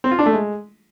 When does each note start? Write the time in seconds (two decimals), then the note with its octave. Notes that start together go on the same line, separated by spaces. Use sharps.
0.04 C4
0.11 F4
0.19 D4
0.26 A3
0.33 G#3